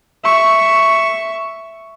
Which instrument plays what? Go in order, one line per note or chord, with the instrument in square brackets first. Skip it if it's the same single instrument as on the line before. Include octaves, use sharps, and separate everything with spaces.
[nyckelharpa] E5 C#6